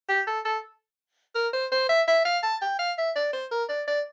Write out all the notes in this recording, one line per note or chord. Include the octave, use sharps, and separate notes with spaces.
G4
A4
A4
A#4
C5
C5
E5
E5
F5
A5
G5
F5
E5
D5
C5
A#4
D5
D5